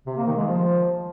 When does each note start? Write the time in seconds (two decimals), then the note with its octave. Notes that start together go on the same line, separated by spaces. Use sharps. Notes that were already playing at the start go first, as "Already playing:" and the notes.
0.07 C3
0.17 A#3
0.27 D#3
0.37 G#3
0.47 F3